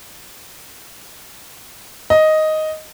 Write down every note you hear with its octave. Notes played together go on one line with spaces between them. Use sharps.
D#5